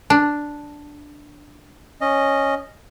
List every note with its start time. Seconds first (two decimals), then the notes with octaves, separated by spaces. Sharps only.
0.10 D4
2.01 C#4 D#5